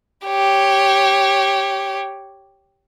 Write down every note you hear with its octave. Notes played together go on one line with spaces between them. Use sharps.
G4 C#5